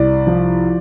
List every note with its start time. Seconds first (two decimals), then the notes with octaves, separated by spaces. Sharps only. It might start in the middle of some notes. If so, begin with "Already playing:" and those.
Already playing: C2 D5
0.27 F3